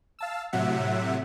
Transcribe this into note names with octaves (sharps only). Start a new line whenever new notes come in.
F5 A5 E6
A2 C3 F#3 E5 F#5